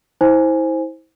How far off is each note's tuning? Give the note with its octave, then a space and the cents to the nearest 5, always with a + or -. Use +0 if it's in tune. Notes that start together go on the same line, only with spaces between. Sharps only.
E4 -35 C5 +5 G#5 +0